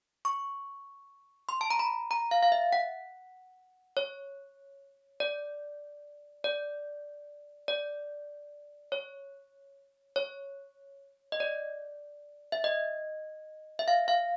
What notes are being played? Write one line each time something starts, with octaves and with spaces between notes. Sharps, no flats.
C#6
C6
A5
A#5
B5
A#5
F5
F5
E5
F#5
C#5
D5
D5
D5
C#5
C#5
D#5
D5
E5
D#5
E5
F5
F5